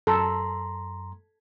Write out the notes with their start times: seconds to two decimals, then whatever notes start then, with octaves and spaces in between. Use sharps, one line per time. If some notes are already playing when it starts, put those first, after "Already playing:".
0.07 F#2 A4 A#5 C6